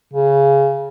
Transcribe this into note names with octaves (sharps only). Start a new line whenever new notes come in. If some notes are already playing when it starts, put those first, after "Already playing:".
C#3